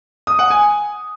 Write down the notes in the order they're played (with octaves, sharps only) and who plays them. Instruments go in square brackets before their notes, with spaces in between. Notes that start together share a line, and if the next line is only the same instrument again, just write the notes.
[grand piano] D#6
F#5
G#5